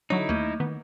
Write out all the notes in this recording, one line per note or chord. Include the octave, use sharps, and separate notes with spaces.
D3 F#3 D#4 E4 C#5
D#2 A3 A#3
D#3 B3